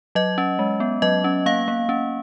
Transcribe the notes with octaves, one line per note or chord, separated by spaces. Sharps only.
F#3 D#5
C#4
G#3
B3
F#3 D#5
C#4
A#3 F5
A#3
C#4